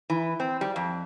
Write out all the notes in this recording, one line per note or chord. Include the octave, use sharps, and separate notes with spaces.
E3
C4
G3
F2